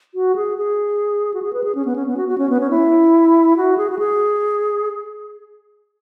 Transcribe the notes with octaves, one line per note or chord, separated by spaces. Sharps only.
F#4
G#4
G#4
F#4
G#4
B4
G#4
C#4
B3
C#4
B3
F#4
F#4
C#4
B3
C#4
E4
F#4
G#4
F#4
G#4